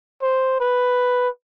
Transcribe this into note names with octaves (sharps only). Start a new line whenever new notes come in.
C5
B4